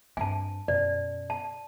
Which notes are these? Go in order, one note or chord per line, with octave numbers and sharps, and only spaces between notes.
G2 C4 G#5 A5
F#2 B2 D5
A5